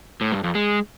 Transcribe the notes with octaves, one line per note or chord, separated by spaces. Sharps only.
A2
G2
F2
G#3